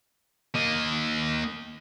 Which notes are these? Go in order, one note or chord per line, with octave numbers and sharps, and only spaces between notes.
A#3 D#5